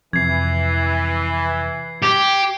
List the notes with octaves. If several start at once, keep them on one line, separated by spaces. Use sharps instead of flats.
F2 C3 E3 G#6 C7
G4